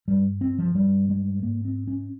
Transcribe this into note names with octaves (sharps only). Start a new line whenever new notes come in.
G2 G3
C4
F3
G2 G3
G#3
G#2 A#3
C4
C#4